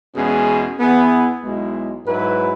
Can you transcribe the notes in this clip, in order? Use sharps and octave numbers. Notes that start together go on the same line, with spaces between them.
E2 B2 G#3 C#4 G#4
E2 E3 B3 E4 G#4
B1 B2 G#3 E4
G#2 F#3 E4 B4